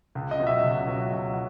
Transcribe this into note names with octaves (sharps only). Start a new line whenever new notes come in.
C#2
D#5
B2 F#3
E5
C#2
B2 F#3
C#2
F#3